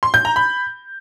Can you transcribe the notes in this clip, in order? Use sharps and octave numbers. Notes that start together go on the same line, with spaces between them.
C6
G6
A#5
B5